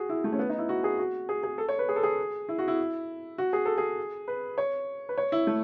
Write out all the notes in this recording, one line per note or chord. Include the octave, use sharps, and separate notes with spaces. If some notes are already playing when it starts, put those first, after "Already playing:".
Already playing: F#4 G#4
E4
A3
C#4
B3
D#4
E4
F#4
G#4
F#4
G#4
G#4
A4
C#5
B4
G#4
A4
G#4
E4
F#4
E4
F#4
G#4
A4
G#4
B4
C#5
B4
C#5
E4
A3